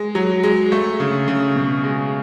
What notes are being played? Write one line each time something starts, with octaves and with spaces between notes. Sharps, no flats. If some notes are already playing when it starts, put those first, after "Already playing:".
Already playing: G#3
F#3
G#3
A3
C#3
C#3
B2
G#3